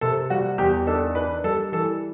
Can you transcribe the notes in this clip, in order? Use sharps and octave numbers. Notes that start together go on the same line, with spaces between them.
C3 A4
G3 F#4
E2 G4
D4 A4
D4 B4
G3 A4
E3 A4